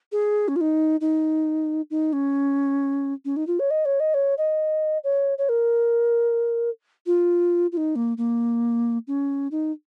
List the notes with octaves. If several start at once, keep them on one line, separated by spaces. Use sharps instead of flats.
G#4
C#4
F4
D#4
D#4
D#4
C#4
C#4
D#4
F4
C#5
D#5
C#5
D#5
C#5
D#5
C#5
C#5
A#4
F4
F4
D#4
A#3
A#3
C#4
D#4